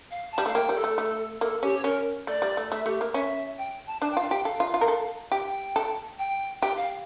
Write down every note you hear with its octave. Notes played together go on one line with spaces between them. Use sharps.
F5
A5
G3
A3 F5
A#3 G5
G3
A4
A3
A3
A#3 A4
C#4 G4
C#5
C#4 A#4
A3 D5
G3
A3
A3 E5
A3 G4
A#3
C#4 E5
G5
A5
D4 A5
G5
F4 F5
G4 G5
A4 F5
F4
F4
A#4
A4
G4 G5
A4
G5
G4 G5
F5